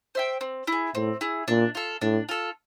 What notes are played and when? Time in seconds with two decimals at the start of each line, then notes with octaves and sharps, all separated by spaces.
0.15 C5 E5 G5
0.41 C4
0.67 E4 G#4
0.95 A2 C4
1.21 E4 G#4
1.48 A#2 D4
1.75 F4 A4
2.01 A2 D4
2.29 F4 A4